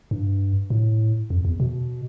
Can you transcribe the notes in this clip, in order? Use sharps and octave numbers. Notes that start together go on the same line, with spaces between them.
G2
A2
F2
E2
B2